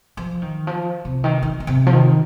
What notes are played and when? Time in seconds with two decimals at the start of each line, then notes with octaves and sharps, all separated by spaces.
0.17 F3
0.42 D#3
0.67 F3
1.05 C3
1.24 D#3
1.42 D#3
1.60 D#3
1.67 C3
1.87 F3
1.93 D#3